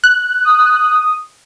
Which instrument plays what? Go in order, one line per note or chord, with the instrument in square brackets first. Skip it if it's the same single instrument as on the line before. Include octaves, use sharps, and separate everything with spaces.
[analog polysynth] F#6
[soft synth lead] D#6